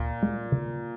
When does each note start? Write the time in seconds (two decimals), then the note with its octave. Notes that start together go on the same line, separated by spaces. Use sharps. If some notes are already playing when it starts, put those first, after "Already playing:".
Already playing: D2 A#2
0.23 G#3
0.52 C#3